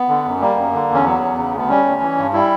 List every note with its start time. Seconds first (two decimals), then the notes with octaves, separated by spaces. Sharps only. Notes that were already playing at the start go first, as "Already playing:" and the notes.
Already playing: B3
0.09 D3
0.25 F#2
0.40 G3 A#3
0.57 F#2
0.73 D3
0.89 E2
0.94 C#4
1.05 F#3 B3
1.21 E2
1.37 C#3
1.53 D2 B3
1.69 G3 C#4
1.86 D2
2.01 E3
2.18 G2
2.33 G3 E4